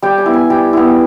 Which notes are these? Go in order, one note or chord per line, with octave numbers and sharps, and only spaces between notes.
G3 G5
G#5
B3 E4
G#5
G3 G5
B3 E4